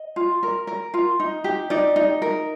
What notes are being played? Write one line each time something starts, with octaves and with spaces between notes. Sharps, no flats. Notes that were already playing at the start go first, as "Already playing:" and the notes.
Already playing: D#5
F4
A#4
A#4
F4
D#4
G4
D#4 D5
D#4
A#4